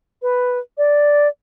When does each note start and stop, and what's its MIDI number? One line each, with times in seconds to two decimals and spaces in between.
0.22 0.59 71
0.78 1.28 74